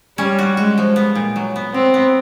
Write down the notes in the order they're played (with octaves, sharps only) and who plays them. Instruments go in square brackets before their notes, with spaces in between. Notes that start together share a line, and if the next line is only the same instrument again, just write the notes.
[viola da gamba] G3 [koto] C#4
[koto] F#4
[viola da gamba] G#3 [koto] F#4
[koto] F3
B3
A#2
F#3
B3
[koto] B3 [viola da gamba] C4
[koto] B3